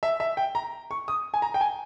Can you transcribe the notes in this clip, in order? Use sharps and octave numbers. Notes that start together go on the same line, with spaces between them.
E5
E5
G5
A#5
C#6
D#6
G#5
A#5
G5
G#5